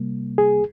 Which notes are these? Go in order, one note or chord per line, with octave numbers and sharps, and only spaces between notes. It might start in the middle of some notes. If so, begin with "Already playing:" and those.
Already playing: C3 G3 A#3
G#4